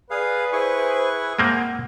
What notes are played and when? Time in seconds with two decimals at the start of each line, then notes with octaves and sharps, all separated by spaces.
0.11 G#4 B4 D5 F5
0.53 E4 G#4 C5 C#6
1.39 G#3 A#3 C4 F#5